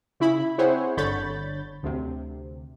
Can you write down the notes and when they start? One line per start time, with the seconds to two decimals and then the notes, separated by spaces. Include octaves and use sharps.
0.20 C#3 E4 B5
0.58 C4 E4 G#4 C5 C#5 F#5
0.97 G1 D3 C#5 B5 G6 A6
1.83 D2 C3